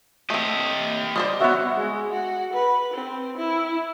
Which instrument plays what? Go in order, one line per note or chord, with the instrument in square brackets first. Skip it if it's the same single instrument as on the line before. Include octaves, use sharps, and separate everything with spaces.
[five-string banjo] A3 C4 [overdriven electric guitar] G4 D#5
[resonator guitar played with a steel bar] G3 [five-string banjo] C5 D5 D#5
[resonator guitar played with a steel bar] B3 C#5 E5 [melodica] F#4
[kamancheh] G#3
F#4
B4
C4
E4